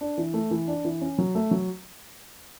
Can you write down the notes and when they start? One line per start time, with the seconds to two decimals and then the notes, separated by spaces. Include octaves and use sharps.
0.01 D4
0.18 E3
0.34 A3
0.51 E3
0.68 D4
0.85 E3
1.01 C#4
1.18 F#3
1.35 A3
1.51 F#3